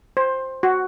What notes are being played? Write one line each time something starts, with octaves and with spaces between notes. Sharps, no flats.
C5
F#4